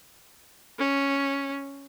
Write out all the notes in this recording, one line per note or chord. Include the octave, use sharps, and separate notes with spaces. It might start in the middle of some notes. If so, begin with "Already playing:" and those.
C#4